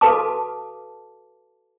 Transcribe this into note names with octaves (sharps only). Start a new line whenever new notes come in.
F#4 A4 B4 F5 A5 D6